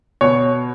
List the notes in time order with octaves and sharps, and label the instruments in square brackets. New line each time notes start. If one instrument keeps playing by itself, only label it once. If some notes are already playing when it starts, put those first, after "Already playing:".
[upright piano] B2 C#5